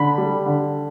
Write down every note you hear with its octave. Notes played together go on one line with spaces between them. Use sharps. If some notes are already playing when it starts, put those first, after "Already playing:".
Already playing: D3 B5
G3
D3